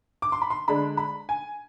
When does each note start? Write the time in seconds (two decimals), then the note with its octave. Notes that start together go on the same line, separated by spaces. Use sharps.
0.22 D6
0.32 C6
0.42 B5
0.50 C6
0.68 D3 G#3 D4 B5
0.97 B5
1.29 G#5